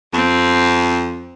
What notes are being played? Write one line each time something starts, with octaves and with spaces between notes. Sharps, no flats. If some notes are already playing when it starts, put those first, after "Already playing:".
F2 C4